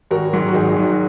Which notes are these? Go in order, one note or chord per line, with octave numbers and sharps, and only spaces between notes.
G#1 F#4 A#4
G#2 F#3
F#4
G#1 D#4 G#4
G#2 F#3